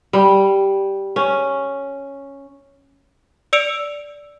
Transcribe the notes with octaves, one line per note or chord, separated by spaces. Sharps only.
G3
C#4
D5 E6 C#7 D7 F7